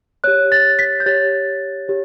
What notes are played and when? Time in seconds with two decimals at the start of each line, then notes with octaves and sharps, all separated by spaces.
0.24 G4 C#5 F#6
0.52 A6
0.79 B6
1.00 G6
1.06 G4 C#5 A6
1.88 G4 C#5